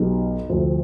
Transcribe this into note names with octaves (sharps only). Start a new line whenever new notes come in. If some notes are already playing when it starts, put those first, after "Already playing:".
Already playing: B1 B2 B3 D#4 G4
D2 C3 F3 C4